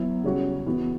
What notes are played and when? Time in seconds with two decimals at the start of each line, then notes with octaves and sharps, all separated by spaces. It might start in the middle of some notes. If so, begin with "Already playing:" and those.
Already playing: F#3 B3 E4
0.24 C#3 G3 C#4 F#4
0.66 E3 B3 F#4